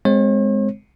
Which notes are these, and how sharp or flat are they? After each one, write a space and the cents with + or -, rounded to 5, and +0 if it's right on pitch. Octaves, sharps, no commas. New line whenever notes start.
G#3 +0 C4 -20 C#5 -45